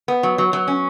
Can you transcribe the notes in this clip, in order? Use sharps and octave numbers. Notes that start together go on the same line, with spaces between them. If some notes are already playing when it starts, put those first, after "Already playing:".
B3
F#3
F#3
F#3
C#4